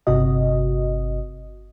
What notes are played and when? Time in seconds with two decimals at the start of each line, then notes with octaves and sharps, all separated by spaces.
0.07 G1 C3 F#4 D#5